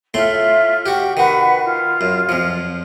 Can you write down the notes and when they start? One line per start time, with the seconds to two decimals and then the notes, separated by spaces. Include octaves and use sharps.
0.14 A2 A3 F4 E5 C6
0.86 F#4 G4 G5
1.17 D#3 F#4 B4 F#5
1.63 F4
2.01 F#2
2.29 F2 F3